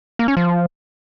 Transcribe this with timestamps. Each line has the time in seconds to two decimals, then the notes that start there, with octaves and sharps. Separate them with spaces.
0.19 A#3
0.28 C#4
0.37 F3